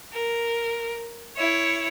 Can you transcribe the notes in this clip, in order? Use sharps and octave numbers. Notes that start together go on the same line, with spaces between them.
A#4
E4 C#5